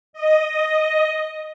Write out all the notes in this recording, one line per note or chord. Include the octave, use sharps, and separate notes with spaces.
D#5